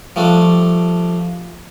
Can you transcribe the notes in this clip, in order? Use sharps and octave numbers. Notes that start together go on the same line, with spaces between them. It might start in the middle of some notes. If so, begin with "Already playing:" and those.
F3 G3 A3 D4